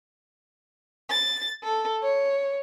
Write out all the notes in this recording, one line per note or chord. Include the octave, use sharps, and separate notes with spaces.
A6
A4
C#5